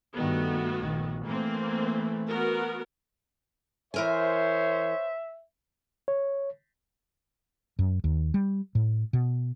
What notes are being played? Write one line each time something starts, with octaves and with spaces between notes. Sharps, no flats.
G2 D#3 A3 B3 F#4
A#1 D#3
E3 A3 A#3 C4
B3 F#4 A#4
E3 A#4 C5 C#5 E5 G#5
C#5
F#2
D#2
G3
A2
B2